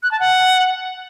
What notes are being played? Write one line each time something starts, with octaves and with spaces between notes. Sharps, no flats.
F#6
A5
F#5